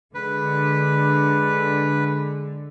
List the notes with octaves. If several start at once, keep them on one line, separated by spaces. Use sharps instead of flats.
D3 G#3 B4